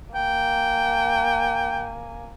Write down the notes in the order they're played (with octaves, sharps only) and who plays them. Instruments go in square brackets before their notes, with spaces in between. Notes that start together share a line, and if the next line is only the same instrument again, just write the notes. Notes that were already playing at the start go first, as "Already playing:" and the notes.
[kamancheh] A#3 G#5 [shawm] G5